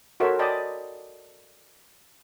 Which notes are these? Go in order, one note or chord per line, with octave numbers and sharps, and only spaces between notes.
F#4 A4 A#4 C5 C#5 E5
D5 D#5 G5 A5 B5